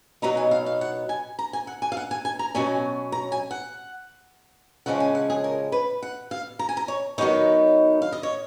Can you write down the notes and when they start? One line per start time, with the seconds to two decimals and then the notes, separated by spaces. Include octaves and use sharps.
0.22 B2 F#3 B3 D#4 A#5
0.37 G#5
0.51 F5
0.66 F5
0.81 F#5
1.09 G#5
1.39 A#5
1.53 G#5
1.67 F#5
1.82 G#5
1.92 F5
1.97 F#5
2.11 G#5
2.25 G#5
2.39 A#5
2.55 B2 F#3 C#4 G#5
3.12 A#5
3.32 G#5
3.51 F#5
4.86 C#3 F3 G#3 C#4 F#5
5.00 G#5
5.15 F#5
5.30 G#4
5.44 A#4
5.72 B4
6.02 F#5
6.31 F5
6.59 A#5
6.69 G#5
6.77 A#5
6.88 C#5
7.18 D#3 F#3 B3 D#4 C#5
8.02 F5
8.12 D#5
8.23 C#5